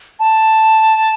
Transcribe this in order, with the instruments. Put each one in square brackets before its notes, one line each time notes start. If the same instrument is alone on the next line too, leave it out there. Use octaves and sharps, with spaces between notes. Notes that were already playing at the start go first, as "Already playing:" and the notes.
[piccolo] A5